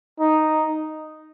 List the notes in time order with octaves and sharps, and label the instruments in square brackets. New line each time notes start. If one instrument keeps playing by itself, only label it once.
[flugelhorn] D#4